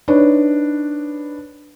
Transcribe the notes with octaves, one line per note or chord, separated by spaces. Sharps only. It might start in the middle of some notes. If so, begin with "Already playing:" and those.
D4 D#4 B4 C#5